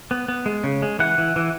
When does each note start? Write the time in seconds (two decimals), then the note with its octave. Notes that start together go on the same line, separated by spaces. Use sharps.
0.11 B3
0.28 B3
0.46 G#3
0.64 C#3
0.82 G#3
0.99 E3 F#5
1.18 E3
1.36 E3